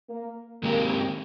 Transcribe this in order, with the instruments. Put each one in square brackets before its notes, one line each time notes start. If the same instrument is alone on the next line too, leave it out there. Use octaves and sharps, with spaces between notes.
[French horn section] A#3
[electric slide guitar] D#3 G#3 C4 G4 A#4 [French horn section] A#3